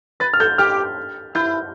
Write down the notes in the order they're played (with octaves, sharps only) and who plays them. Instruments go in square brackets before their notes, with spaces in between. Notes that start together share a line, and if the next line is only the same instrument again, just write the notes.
[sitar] B4 [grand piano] A6
[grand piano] F6
[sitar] A4 [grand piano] G6
[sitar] G4 [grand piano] F6
[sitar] E4 [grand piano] G6